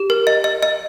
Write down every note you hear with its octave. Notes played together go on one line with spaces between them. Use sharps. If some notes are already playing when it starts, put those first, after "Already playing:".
Already playing: G4
A#4
D#5
D#5
D#5